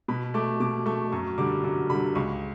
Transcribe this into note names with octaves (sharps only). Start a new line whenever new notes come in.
B2 B5
A3 D6
B2 D6
A3 C#6
F#2 C#6
D3 G3 D6
F#2 D6
D3 G3 B5
C#2 C#6